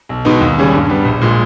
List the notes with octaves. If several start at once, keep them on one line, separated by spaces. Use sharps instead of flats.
B1
B2 G#3 B3 D#4
D#2
C#3 G3 C#4 G#4
G2
G3 B3
A#1
A#2 G#3